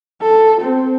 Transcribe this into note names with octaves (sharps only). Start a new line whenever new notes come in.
A4
C4